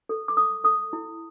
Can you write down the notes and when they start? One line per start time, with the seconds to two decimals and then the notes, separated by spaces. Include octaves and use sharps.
0.09 A4
0.28 D6
0.37 A4 D#6
0.64 A4 D#6
0.93 E4